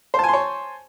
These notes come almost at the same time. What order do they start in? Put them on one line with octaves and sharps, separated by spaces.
C5 A5 G#5 C6 C#5